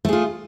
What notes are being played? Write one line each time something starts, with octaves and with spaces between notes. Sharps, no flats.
A3 F4 G#4